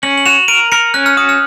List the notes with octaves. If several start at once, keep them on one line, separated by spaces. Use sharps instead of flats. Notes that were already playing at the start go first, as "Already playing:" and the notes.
C#4 F#7
F#7
F#4 F7
A#4 D#7
A#4 C#7
C#4 F#6
F6
F#4 D#6
F6